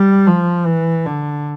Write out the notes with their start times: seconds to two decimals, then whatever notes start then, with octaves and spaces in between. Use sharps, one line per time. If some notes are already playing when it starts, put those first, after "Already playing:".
Already playing: G3
0.27 F3
0.66 E3
1.06 D3